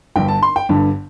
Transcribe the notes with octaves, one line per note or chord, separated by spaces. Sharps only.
G1 G2 D3 G5
A5
C6
G5
G1 G2 D3